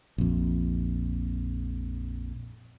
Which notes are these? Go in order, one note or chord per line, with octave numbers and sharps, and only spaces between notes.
A#1 F2